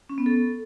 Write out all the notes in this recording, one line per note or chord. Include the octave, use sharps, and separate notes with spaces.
C#4
B3
A4